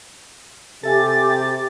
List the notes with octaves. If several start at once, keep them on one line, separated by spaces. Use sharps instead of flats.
C3 G4 A4 E5 G#5 A6